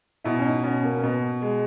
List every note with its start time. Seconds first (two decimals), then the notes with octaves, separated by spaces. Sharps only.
0.24 B2 E4
0.39 C#4
0.45 D#4
0.63 B2 C#4
0.83 A#3
0.97 C#4
1.03 B2 B3
1.42 G#3